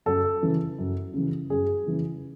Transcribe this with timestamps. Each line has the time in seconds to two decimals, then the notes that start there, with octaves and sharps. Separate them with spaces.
0.06 F#2 A4
0.42 C#3 E3
0.78 F#2
1.14 C#3 E3
1.50 F#2 G#4
1.86 C#3 E3